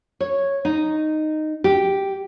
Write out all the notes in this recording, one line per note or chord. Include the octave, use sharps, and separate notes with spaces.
C#5
D#4
G4